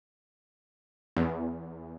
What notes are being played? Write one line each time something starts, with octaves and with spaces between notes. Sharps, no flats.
E2